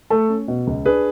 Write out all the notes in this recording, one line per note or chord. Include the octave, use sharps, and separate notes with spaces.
A3 A4
C#4
B2
C#2
D4 G#4 B4